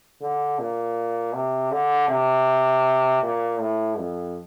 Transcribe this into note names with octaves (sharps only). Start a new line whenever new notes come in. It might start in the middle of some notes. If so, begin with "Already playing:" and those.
D3
A#2
C3
D3
C3
A#2
A2
F2